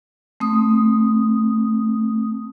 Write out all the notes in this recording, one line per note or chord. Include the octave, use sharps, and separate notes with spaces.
A3 C4 D#6